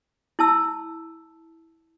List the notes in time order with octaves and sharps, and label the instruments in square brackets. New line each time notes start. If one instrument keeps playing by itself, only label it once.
[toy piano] E4 A5 E6